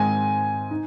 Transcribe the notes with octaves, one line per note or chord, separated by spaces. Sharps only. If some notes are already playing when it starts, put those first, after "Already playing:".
Already playing: G#2 D#3 G#3 C4 G#5
D#4